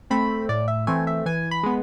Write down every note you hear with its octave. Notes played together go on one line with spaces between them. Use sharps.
A3 C4 B5
A2 D5
E5
E3 A3 C4 G#5
E5
E3 G#5
B5
G#3 B3